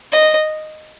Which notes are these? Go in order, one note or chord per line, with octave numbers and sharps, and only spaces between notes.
D#5